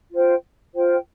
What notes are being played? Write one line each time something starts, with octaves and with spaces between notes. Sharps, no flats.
F4 C5 G5
F4 C5 G5